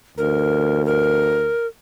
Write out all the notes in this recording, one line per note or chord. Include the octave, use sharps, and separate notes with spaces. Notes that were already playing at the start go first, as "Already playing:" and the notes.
D2 A#4
A#4